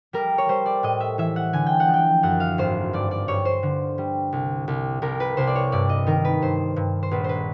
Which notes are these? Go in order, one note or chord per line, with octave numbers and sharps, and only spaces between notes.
G3 A#4
C#5
G3 C5
D5
A2 D#5
E5
E3 E5
F#5
D3 G#5
G5
F#5
F3
G5
F#2 F#5
F5
G#1 C5
G2 D5
D5
G2 C#5
C5
D3
G3
C2
C2
C2 A#4
B4
C2 C5
D5
C#5
G2 D5
D#5
D#3 A#4
B4
G2 C5
G2
C5
A#1 B4
B4 C5